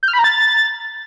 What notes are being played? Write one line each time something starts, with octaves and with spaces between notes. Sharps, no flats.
G6
F6
B5
A#5
A6